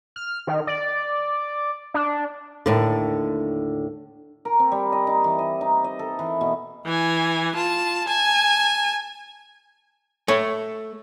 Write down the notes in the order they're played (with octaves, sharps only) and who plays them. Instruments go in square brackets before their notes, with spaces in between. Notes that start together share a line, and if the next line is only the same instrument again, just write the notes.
[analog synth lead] F6
D#3
D5
D4
[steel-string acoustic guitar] D#2 A2 D3
[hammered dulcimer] A#4
C4
G3
D#5
D#4
E3
D#5
D#4
D#5
A4
E3
B2
[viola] E3 G#5
F4 A5
G#5 A5
[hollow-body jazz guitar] A3 C#5